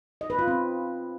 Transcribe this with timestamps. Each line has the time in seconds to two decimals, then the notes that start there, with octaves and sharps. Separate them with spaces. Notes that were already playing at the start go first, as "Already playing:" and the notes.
0.21 D#5
0.30 B4
0.39 F4
0.48 C4